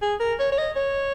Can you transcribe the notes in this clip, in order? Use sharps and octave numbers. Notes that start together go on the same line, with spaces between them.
G#4
A#4
C#5
C#5
D#5
C#5